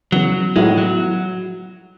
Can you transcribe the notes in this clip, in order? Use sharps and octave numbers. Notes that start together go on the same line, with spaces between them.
C#3 E3 F#3 B3
A2 F#3 G#3 B3 E4
F#3